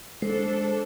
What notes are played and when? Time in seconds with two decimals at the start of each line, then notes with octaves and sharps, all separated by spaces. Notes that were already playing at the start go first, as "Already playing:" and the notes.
0.22 G#3 D4 A4 C5